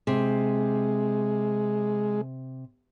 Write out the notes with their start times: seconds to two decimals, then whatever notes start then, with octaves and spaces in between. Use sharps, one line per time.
0.07 C3 G#3